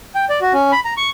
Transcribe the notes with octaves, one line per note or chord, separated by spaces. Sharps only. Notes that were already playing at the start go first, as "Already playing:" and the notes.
G5
D5
F#4
C#4
B5
A#5
C#6